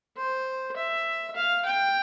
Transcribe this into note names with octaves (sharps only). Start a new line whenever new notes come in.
C5
E5
F5
G5